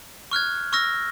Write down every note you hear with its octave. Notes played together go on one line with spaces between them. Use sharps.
C#6 F6 F#6 G#6
C#6 E6 F6 A#6